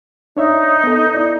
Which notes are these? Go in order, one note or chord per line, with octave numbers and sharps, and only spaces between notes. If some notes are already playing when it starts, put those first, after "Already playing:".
D4 D#4 C#5 E5
B3 A4
E4 D5